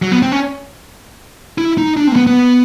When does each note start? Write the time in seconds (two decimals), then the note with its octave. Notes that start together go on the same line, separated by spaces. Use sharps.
0.02 F#3
0.12 B3
0.22 C4
0.32 C#4
1.58 E4
1.78 D#4
1.97 D4
2.07 C4
2.12 A#3
2.16 B3
2.27 B3